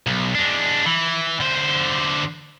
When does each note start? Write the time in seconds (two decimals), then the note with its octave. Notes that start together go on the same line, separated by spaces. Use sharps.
0.07 B1
0.35 G#3 D4
0.86 E3
1.40 D3 C5